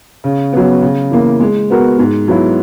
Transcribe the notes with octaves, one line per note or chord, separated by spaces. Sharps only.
C#3
F#3 B3
C#3
E3 A#3
G#3
B3 F#4 A#4
G#2
F#3 B3 E4